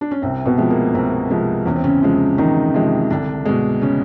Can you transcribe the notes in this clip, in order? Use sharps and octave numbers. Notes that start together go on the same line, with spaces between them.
D4
C#4
C2 C3 C4
B2 B3
C3 F3 G#3
A#3
C2 C3 C4
C3 F3 G#3
E2 C#4
C4
C#3 C#4
C3 F3 G#3
E2 D#3 D#4
C3 F3 G#3
C2 D3 D4
B2 G#3
C#3 C#4